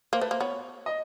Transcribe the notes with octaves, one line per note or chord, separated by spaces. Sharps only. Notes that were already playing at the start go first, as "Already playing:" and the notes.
A#3 C5
A3 B4
A#3 C5
B3 C#5
D#5